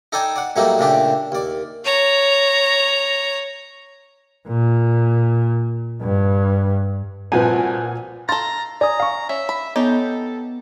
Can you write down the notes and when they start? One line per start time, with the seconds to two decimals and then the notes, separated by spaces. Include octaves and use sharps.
0.12 D#4 A4 D5 G5 G#5
0.36 D5 F#5
0.56 A2 F#3 G3 A3 A#3 D#4
0.79 A#2 C#3 A3 D4 G4
1.32 D#2 D5
1.84 C#5 A#5
4.47 A#2
6.01 G2
7.32 C2 A#2 F3 F#4 B4 G#5
8.29 A4 F5 A#5 C6 A6
8.81 D5 G#5 A#5 D#6
9.00 F5 C#6
9.29 C#4 E5
9.49 B5
9.76 B3 C#4 D#4 G4 A4